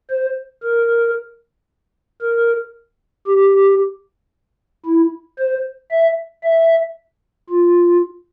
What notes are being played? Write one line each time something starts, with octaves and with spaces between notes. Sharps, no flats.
C5
A#4
A#4
G4
E4
C5
E5
E5
F4